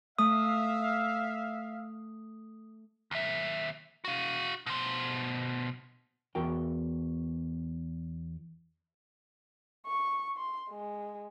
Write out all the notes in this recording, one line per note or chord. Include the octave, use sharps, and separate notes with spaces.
A3 E5 F5 D#6
D#2 E5
F#4 F5
B2 C5
E2 F#4 A#4 G5
C#6
C6
G#3